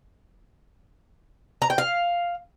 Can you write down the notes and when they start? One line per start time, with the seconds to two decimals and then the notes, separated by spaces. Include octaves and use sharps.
1.62 A#5
1.70 G5
1.78 F5